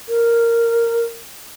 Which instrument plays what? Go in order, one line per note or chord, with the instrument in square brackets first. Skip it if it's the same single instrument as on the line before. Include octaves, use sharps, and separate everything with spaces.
[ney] A#4